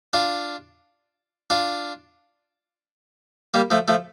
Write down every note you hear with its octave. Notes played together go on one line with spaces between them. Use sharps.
D4 F4
D4 F4
G3 A#3
F3 A3
F3 A3